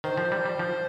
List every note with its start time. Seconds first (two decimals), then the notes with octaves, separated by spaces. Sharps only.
0.04 D#3 C5
0.18 F3
0.32 G3
0.46 G3
0.59 F3